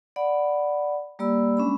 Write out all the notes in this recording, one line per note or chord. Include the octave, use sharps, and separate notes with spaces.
D5 F#5 B5
G3 A#3 G4 D5 B5 E6
G#3 C#4 D4 B5